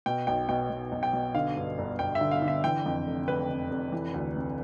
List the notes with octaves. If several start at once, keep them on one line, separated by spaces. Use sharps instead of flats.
B2 G5
B1 G5
B2 G5
B2
B1
G5
B2
D3 F5
G2
G1
G1 G5
E5
D3
F5
D3
E5
E3 G5
F2
F1
F1 B4
F1
F1
E3
D2
C3